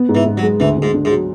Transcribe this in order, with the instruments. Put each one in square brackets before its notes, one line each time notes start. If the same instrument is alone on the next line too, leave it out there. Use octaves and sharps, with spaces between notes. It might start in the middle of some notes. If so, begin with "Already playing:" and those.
Already playing: [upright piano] B3
G#2
[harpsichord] E3
[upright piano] G#2
[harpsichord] F#3
[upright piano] G#3
[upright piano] D2 [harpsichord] E3
[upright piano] D2
[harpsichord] G#2
[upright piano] D3
[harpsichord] G#2
[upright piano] F#3